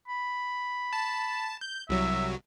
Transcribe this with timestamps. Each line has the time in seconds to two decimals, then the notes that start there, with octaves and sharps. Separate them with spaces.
0.08 B5
0.93 A5
1.61 G6
1.89 C2 F#3 E5